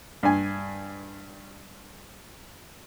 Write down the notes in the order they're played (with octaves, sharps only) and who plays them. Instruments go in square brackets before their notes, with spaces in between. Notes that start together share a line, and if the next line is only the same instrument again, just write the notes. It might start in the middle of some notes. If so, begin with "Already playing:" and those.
[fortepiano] G2 G#5